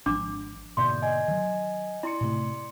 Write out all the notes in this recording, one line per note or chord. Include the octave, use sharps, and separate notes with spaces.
G#1 F3 D4 D6
G#2 B2 D3 A#3 D5 C6 G6
D#5 G#5 G#6
D#3 F#3
E4 D5 C6 C#7
A2 C3 A3